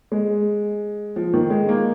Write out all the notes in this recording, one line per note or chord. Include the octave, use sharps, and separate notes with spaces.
G#3
F3
D#3
G#3
A#3